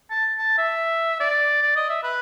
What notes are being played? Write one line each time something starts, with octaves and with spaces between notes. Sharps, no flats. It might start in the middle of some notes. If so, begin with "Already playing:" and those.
A5
A5
E5
D5
D5
D#5
E5
B4